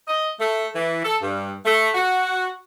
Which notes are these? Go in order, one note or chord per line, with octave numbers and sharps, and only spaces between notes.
D#5
A3
E3
A4
G2
A3
F#4